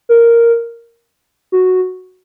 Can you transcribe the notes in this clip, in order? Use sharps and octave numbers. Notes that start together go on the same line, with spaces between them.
A#4
F#4